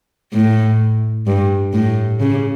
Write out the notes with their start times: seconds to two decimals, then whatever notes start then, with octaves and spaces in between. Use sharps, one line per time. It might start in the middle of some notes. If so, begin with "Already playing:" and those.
0.33 A2
1.27 G2
1.73 A2
2.20 C#3